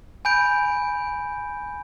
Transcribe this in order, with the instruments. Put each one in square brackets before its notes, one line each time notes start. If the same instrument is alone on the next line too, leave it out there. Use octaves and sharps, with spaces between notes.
[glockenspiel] G#5 B5 G6 D7